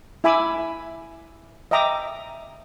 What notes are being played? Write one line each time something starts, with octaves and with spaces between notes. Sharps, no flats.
E4 E5 G#5 B5 D6 E6
D#5 E5 G5 A#5 D6 D#6